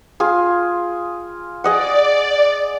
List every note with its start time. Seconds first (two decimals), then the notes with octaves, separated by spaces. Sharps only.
0.20 F4 G#4
1.64 G#4 D5 D#5 F#5